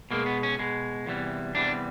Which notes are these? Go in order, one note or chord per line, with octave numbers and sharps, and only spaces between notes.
B2 G#3 A#3
B3
C#4
B2 G#3
E2 C3 E3 G3
E2 C3 E3 G3 D4